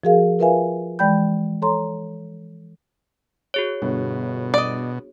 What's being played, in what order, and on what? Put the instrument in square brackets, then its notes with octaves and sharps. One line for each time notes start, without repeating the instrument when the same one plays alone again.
[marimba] F3 F#4 G#4 A#4 F5
F4 A#4 B4 E5 F5 G#5
E3 G#3 D5 G5 B5 G6
A4 C#5 A#5 C6
[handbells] F#4 G#4 C#5
[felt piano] G1 [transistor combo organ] B2
[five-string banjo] D5 D#5